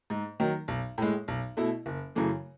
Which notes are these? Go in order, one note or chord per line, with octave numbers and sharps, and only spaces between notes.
G#2
D#3 F#3
B1
A2 G#3
B1
B2 A3 E4
F#1
F#2 C#3 E3 A3